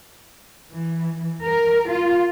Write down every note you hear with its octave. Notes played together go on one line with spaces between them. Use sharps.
E3
A#4
F4